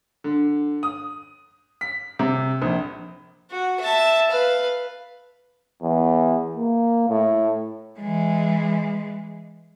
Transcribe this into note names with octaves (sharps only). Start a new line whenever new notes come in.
D3
D#6
B6
C3
A#1
F#4
E5 A5
B4 F5
E2
A#3
A2
E3 G#3